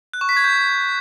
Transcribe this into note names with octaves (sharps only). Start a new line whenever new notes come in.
F#6
C#6
B6
G#6
G6